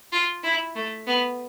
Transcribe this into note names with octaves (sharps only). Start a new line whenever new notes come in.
F4
E4
A3
B3